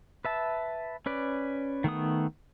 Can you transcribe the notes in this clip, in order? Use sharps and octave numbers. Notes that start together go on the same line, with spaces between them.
B4 E5 A5
C#4 B4 D5
D#3 A3 B3 D#6